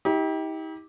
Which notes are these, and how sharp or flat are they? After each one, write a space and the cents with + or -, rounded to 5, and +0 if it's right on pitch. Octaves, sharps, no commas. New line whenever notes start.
D#4 +45 G4 +0